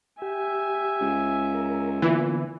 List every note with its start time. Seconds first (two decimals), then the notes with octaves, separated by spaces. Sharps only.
0.22 G4 E5 G#5
1.01 C#2
1.55 A#4
2.02 A#2 D3 E3 B3